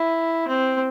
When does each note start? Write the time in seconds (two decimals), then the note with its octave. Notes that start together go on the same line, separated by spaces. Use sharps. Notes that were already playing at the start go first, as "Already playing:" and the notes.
Already playing: E4
0.48 C4